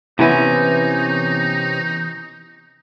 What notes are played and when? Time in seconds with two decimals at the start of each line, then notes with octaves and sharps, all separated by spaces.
0.19 C3 E3 B3 C#4 D#4 E4